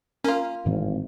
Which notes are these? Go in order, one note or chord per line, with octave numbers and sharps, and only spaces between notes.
A#3 C#4 F4
G#1 A2 E3 C4